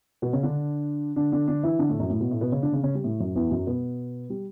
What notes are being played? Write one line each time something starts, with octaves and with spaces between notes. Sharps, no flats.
B2 B3
C#3 C#4
D3 D4
D3 D4
D3 D4
D3 D4
E3 E4
D3 D4
A2 A3
F#2 F#3
A2
B2
A2 A3
B2 B3
C#3 C#4
D3 D4
C#3 C#4
C#3 C#4
G3
A2 A3
F#2 F#3
E2 E3
F#2 F#3
B2 B3
G3